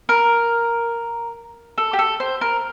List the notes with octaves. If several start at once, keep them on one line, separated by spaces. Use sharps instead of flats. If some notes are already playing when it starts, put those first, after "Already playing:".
A#4
A4
G4
A4
C5
A#4